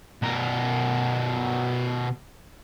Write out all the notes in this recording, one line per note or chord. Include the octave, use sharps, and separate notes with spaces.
B2 A#4